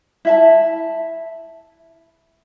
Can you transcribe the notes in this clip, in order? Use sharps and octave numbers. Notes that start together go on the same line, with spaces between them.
E4 E5 A5